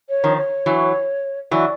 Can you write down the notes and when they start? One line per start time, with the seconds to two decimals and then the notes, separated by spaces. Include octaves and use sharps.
0.09 C#5
0.24 D#3 F3
0.37 C#5
0.66 E3 F#3
1.51 E3 F#3 D5